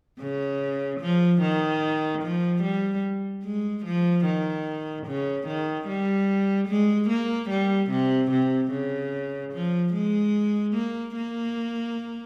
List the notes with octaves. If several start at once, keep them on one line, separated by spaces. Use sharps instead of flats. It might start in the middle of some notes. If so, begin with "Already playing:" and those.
C#3
F3
D#3
F3
G3
G#3
F3
D#3
C#3
D#3
G3
G#3
A#3
G3
C3
C3
C#3
F3
G#3
A#3
A#3